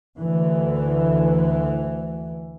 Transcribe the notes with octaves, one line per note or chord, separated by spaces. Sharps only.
D2 E3